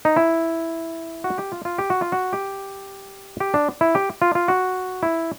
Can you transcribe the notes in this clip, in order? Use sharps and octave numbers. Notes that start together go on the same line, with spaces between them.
D#4
E4
F#4
G4
F4
F4
G4
F#4
F4
F#4
G4
G4
D4
E4
G4
F4
F4
F#4
E4